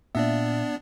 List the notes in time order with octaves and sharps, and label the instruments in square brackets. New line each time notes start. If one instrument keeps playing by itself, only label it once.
[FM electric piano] A#2 E5 [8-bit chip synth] B3 D4 D5